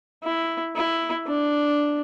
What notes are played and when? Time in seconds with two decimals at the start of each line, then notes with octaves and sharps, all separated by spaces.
0.24 E4
0.76 E4
1.27 D4